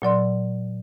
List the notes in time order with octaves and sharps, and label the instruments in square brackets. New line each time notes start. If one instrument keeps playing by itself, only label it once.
[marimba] A#2 F#3 D5 C6